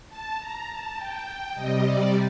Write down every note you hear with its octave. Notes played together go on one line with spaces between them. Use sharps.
A5
A#5
A5
G5
G5
C3 G3 D#5
D5